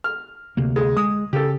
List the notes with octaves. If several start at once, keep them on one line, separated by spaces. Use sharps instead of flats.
F6
D2 C3 A#3
G#3
G#3 D#6
C#3 G4 A4